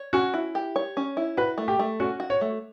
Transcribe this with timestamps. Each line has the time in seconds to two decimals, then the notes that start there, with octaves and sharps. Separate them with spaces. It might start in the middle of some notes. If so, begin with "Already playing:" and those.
Already playing: C#5
0.13 C#4 F#4
0.34 E4
0.55 G4
0.76 C#5
0.97 C#4
1.17 E4
1.37 F#4 B4
1.58 A3
1.68 G4
1.79 A3
2.00 C#4 F#4
2.20 F#4
2.30 C#5
2.41 A3